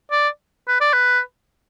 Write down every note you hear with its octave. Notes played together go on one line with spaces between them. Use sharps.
D5
B4
D5
B4